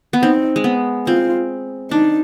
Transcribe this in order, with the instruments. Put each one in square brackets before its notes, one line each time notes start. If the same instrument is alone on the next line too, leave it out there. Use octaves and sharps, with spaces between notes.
[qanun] B3
[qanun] C4 [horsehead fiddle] D#4
[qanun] G#3
B3
[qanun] C4 [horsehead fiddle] F4
[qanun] D4 [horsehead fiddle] D#4